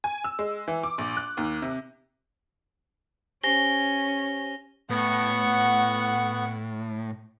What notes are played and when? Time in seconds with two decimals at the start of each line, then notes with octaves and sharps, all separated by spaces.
0.04 G#5
0.24 E6
0.39 G#3
0.68 E3
0.83 D6
0.98 A#1
1.17 F#6
1.37 D#2
1.62 C3
3.43 C#4 G4 C5 G#5 A#6 G7
4.90 A2 B3 F#5 C#6